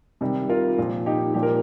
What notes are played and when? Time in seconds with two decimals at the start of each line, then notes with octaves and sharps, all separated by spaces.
0.21 C3 D#3 G3
0.49 F4 A#4
0.78 A#2 F3
1.06 D#4 G4
1.34 A#2 F3 G4
1.43 A#4